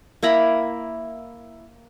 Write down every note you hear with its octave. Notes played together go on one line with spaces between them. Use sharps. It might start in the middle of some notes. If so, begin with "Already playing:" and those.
A#3 E4 A#5 B5